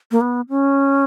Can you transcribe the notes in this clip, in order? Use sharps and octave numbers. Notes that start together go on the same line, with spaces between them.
A#3
B3
C#4